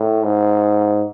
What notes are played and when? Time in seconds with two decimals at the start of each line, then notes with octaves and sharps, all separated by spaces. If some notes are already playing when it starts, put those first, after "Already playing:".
Already playing: A2
0.24 G#2